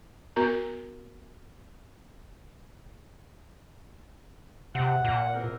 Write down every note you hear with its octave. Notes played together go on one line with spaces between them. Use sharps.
B3 F#4 A#4 A#5
C3 F#5
A#2
E2 C4 A#4